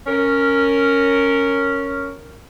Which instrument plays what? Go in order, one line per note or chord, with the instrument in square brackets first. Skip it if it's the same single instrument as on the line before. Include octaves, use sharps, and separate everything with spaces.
[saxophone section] C#4 A#4